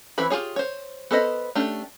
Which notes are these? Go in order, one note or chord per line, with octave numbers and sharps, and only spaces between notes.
E3 C4 E4 B4 B5
F4 G4 G#4 C#5
C5 C#5
B3 A4 B4 C5 D#5
A3 C#4 D4 G4